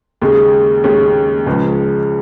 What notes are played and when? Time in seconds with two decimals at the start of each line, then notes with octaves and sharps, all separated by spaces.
0.22 D#2 C#3 G#3
0.84 D#2 C#3 G#3 C#4
1.46 C#2 C#3 F3 G#3